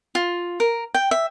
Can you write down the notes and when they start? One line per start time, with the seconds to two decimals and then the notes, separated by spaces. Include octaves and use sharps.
0.15 F4
0.60 A#4
0.95 G5
1.11 E5